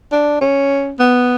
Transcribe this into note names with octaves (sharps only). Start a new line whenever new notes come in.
D4
C#4
B3